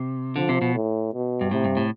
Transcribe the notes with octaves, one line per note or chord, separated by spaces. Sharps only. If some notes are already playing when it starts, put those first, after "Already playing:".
Already playing: C3
D3 F3
C3
B2
A2
B2
G2
A2 C3
G2
A2